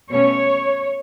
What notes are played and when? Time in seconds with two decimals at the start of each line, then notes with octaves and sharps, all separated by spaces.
0.11 B2 A3 C#4 C#5